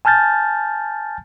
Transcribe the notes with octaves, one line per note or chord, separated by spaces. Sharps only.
G#5 A5 F6 G6 A6